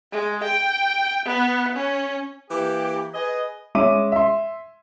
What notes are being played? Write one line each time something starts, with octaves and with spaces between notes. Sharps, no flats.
G#3
G5
B3
C#4
E3 A#3 G4
G#4 B4 D#5
G#3 C#4 C#5 E5 D6 D#7
E5 C6